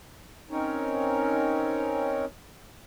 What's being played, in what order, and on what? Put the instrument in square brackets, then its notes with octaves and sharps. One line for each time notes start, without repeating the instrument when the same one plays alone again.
[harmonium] C4 C#4 D#4 A#4 C#5